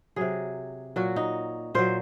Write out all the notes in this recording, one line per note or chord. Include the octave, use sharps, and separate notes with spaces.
C3 F#3 G#4
A#2 F#3 F#4
D#4
A#2 F#3 C5